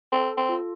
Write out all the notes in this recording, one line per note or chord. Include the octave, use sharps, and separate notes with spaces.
C4 A4
C4
F4